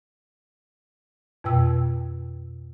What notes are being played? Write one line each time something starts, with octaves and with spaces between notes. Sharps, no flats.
F2 B2 G5 E6